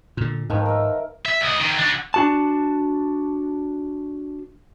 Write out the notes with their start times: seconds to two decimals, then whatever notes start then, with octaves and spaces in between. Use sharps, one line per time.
0.17 A#2 D3
0.50 G#2 D#3 F3 B4
0.66 A#4 E5
1.26 E5
1.41 C#2 D#5
1.61 D#3 C4
1.79 D4 F#4
2.14 D4 F#4 A5